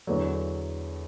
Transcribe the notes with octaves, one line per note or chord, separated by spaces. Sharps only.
E2 D3 F#3